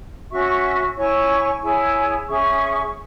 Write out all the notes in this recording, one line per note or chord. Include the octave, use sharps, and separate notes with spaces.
C#4 F#4 E5 C#6
E4 C#5 G#5 C#6
E4 G#4 C#5 G#5
C#4 G#4 E5 C#6